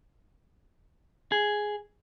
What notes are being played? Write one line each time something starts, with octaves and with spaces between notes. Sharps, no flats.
G#4